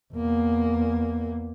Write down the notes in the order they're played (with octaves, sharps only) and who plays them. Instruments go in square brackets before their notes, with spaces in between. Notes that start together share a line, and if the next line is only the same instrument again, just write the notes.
[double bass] E2 A#3